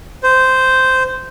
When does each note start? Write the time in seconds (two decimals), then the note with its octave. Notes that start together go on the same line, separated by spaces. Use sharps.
0.23 C5